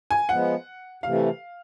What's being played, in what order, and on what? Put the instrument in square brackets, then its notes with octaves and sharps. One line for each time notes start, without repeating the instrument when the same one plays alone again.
[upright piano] G#5
[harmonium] F3 G#3 B3 [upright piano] F#5
[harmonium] C3 E3 A3 [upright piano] F5